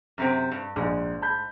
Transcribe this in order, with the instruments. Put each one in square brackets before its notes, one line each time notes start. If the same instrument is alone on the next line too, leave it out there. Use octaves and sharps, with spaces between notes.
[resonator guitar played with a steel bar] F#2 C3 C4
G2
[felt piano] A#1 [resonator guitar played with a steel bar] G#2
[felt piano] A5 B5 G6